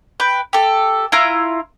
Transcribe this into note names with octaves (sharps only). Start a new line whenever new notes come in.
B4 G5
G4 A4
E4 F4 A#5